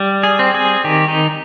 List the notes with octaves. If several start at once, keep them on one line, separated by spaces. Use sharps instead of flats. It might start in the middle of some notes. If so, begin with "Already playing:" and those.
Already playing: G3
G#4
C4
G#4
D#3 G4
D#4